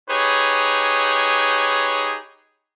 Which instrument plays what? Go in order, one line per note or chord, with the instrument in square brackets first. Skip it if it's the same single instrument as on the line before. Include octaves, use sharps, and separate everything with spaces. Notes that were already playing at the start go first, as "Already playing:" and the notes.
[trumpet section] D#4 G4 G#4 B4 C#5